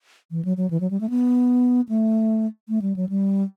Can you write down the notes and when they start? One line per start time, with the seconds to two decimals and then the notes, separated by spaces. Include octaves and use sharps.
0.31 E3
0.45 F#3
0.57 F#3
0.70 E3
0.80 F#3
0.91 G3
1.01 A3
1.10 B3
1.89 A3
2.69 A3
2.82 G3
2.96 F#3
3.09 G3